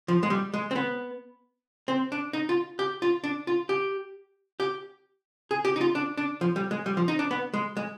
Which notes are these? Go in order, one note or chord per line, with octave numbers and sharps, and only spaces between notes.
F3
G#3
G3
G#3
C4
B3
C4
D4
D#4
F4
G4
F4
D4
F4
G4
G4
G#4
G4
D#4
F4
D4
D4
F3
G3
G#3
G3
F3
D#4
D4
B3
G#3
G#3